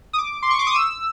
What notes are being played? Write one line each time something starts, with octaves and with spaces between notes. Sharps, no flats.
D#6
D6
C6
C#6
D6
D#6
E6